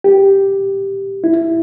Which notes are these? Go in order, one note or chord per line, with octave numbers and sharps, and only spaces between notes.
G4
E4